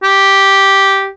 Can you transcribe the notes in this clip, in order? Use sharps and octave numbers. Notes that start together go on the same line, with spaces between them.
G4